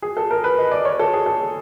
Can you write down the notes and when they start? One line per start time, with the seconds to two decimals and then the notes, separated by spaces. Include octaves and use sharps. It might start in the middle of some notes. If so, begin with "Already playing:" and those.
0.02 G#4
0.17 A4
0.31 A#4
0.44 B4
0.58 D#5
0.71 D5
0.85 C#5
0.99 A4
1.13 G#4
1.26 A4